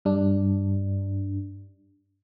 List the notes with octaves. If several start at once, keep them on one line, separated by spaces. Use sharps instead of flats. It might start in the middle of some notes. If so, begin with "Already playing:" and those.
G2 G3 D4